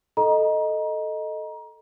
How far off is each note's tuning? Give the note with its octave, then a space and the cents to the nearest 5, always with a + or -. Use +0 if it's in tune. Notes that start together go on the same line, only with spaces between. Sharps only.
A4 +0 D#5 +0 A#5 +30